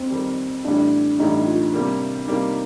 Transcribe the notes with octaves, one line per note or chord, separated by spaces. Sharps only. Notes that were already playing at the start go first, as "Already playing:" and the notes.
Already playing: F2 C4
F2 D#3 G3
A1 A2 G3 D4
A1 A2 G3 D#4
F4
C3 G3 A#3
C3 G3 A#3 D#4